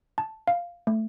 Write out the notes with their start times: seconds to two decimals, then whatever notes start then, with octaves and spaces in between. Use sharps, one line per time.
0.18 A5
0.47 F5
0.87 A3